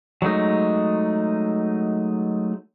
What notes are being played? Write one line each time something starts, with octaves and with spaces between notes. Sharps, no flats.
F#3 G#3 A3 D#4